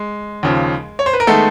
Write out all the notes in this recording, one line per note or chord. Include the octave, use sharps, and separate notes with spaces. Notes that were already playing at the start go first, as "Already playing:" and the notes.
Already playing: G#3
D#2 C#3 F3
C#5
C5
B4
A#4
D#3 G#3 A3 B3 A4